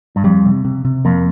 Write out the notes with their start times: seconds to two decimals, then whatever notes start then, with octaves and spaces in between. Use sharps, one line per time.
0.16 G2
0.24 F2 G3
0.45 C3
0.65 C3
0.85 C3
1.05 F2 A#3